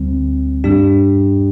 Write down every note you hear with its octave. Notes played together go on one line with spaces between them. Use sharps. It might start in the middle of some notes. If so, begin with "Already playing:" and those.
Already playing: D2 D3 G3 C4
G2 G3 D4 G4